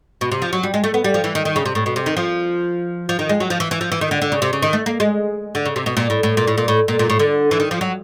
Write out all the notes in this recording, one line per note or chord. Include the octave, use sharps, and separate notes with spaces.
B2
C3
F3
F#3
G3
G#3
A3
B3
G3
F3
E3
D#3
D#3
C#3
C3
A2
B2
C3
D#3
F3
F3
D#3
G#3
F#3
F3
E3
E3
F3
E3
D#3
D3
D3
C#3
C3
C#3
D#3
A3
A#3
G#3
D3
C#3
C3
B2
A#2
A2
A2
A#2
A2
A#2
A2
A#2
A#2
A2
D3
E3
D#3
F3
F#3